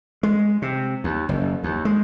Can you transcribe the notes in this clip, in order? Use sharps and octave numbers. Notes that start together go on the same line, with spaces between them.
G#3
C3
D#2
F#1
D#2
G#3